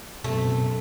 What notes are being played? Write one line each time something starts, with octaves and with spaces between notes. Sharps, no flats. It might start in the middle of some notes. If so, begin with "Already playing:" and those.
F#2 B2 A3 C4